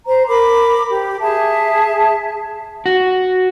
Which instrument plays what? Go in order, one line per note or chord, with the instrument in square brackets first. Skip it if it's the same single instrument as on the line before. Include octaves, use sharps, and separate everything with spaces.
[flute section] C5 A#5
A#4 B5 D6
G4
G#4 E5 A5
[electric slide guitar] F#4